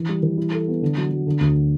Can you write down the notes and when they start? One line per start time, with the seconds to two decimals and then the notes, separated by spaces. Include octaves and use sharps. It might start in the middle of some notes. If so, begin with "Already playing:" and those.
Already playing: E3
0.09 G3
0.23 E3
0.38 E4
0.52 A4
0.68 B3
0.82 D3
0.97 F#3
1.11 F#3
1.27 D3
1.40 D2